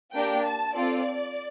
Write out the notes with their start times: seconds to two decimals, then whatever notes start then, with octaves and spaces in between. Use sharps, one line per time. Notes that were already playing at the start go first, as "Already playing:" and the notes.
0.13 A#3 D4 G4 G5
0.44 A5
0.75 C4 F4 A4 D5